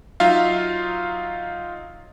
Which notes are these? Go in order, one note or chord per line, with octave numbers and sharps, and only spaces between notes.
F#3 D#4 F4 E5 F5